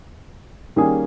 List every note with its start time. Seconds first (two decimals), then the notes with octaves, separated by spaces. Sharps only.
0.76 D#3 G3 A#3 C#4 G#4